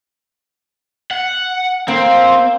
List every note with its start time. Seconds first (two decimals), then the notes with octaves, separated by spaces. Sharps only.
1.11 F#5
1.88 A#3 C4